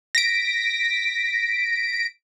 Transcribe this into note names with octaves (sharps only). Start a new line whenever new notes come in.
A#6 B6 D7